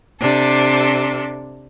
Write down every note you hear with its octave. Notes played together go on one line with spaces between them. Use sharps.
C3 D4 A4